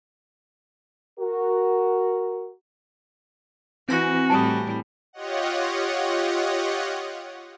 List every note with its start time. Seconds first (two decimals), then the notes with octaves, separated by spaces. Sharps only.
1.19 F#4 A#4
3.89 E3 C4 F#4 G#5 A#6
4.30 A2 G3 A5 D#6
5.13 F4 G4 C#5 D#5 F#5